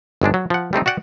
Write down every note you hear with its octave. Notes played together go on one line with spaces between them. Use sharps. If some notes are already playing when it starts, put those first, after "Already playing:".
G1 G#2 G#3 D4
F#3
F3 F#5
G3 A3 C4 D#4
F#4 D5 F#5 G5